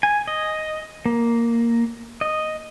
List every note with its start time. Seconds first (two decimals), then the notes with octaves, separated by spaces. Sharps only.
0.03 G#5
0.27 D#5
1.06 A#3
2.21 D#5